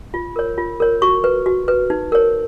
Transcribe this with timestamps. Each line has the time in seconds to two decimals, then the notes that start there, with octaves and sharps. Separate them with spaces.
0.14 F4
0.36 A#4 C#5
0.58 F4
0.80 A#4 C#5
1.02 F#4 C#6
1.24 B4
1.46 F#4
1.68 B4
1.90 D#4
2.12 A#4 C#5